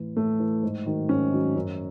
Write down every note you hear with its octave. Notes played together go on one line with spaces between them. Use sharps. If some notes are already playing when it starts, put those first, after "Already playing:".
Already playing: A2 E3
A2 A3
E3
G#2
D#3 F#3
G#2 C#4
D#3 F#3
F#2